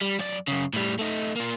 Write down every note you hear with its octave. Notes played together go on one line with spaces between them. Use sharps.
G3
F#2 D5
F#2 C#3
A2 G3
A3 D#4
A#3 F4